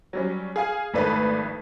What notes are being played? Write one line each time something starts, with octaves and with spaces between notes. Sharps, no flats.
F#3 G3 C#4
G#4 F5 G#5
G#1 F2 A2 A3 D4 B4